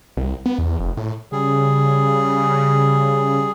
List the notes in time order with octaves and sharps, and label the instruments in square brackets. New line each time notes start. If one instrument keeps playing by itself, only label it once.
[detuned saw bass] C2
B3
E2
F1
A2
[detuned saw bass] C#3 [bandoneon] G3 G#4